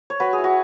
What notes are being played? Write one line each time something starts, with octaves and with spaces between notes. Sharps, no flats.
C#5
F#3 F#4 B4
G#4
E4
F#4